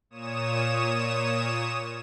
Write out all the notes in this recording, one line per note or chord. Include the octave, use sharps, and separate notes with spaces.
A#2 C#5 D#6 E7